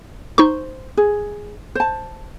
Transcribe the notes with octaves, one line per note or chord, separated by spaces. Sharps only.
D#4 C5 C#6
G#4
C5 A5